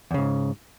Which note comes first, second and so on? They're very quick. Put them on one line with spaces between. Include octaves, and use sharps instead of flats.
E2 C#3 G#2